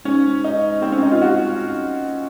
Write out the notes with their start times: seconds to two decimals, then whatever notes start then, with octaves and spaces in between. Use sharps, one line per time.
0.05 G#2 C#4
0.44 D#4
0.82 C4
0.92 C#4
1.02 D#4
1.12 F4
1.22 F#4